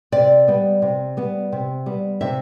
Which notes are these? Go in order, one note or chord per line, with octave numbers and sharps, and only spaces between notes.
C3 D5
G3 B3
C3
G3 B3
C3
G3 B3
C3 E5